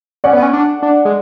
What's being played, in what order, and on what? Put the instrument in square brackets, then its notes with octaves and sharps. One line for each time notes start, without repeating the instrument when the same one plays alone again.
[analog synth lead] C#4 [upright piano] D5 F#5
[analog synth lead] B3
C#4
D4
D4
G#3